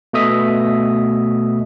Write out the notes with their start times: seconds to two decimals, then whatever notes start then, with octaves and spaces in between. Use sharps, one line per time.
0.13 B2 A3 D#5 E5 D#6 B6